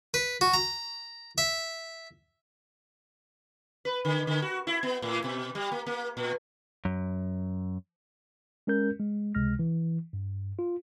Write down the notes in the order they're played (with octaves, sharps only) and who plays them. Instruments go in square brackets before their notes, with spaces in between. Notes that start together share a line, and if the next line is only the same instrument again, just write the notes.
[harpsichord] B4
F#4
A#5
E5
[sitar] B4
D3
D3
F#4
E4
B3
A2
B2
G3
A#3
A#3
A#2
[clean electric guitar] F#2
[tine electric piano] G#3 C#4 A#4 G6
G#3
C#2 C3 G#3 F6 A#6
E3
G2
F4